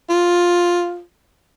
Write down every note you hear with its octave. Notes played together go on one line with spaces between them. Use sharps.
F4